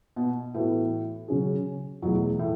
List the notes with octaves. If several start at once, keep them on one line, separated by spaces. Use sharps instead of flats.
B2
A2 E3 B3 F#4
C#3 F#3 C#4 G#4
E2 B2 F#3 A3 E4 G#4
A2